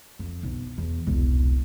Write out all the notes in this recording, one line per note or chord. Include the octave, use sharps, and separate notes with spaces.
F2
B1
E2
E1 C2